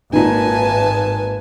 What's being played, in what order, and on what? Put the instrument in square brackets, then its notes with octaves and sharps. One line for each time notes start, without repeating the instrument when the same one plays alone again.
[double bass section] G#1 [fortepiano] A#2 D#3 [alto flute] B4 [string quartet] G#5 A5